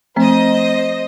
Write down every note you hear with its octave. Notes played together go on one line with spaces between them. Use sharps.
F3 A3 C4 C5 D#5